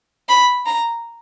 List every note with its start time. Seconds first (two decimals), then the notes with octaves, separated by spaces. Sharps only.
0.29 B5
0.66 A#5